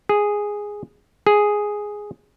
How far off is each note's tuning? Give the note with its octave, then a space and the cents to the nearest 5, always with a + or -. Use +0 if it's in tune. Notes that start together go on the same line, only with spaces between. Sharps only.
G#4 -5
G#4 +0